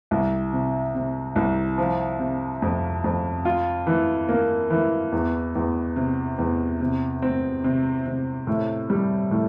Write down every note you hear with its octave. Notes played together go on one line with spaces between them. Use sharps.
C2
C3
C3
C2
F3
C3
F2
F2
F4
E3
A#3
E3
E2
E2
C3
E2
C3
C4
C3
C3
A2
G3
A2